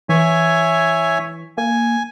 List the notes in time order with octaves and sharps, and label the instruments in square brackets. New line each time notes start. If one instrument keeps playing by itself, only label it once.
[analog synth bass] E3 [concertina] C#5 E5 G#5
[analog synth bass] A#3 [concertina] G#5